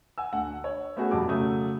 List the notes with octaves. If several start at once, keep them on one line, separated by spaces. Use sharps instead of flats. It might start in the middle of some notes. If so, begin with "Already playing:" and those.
F#5 G#5 E6
D2 F#5
C#5
A3 B3 C#4 F#4 G#4
F2 B2 F#3 G3 D6
C#3 F#3 A3 D#6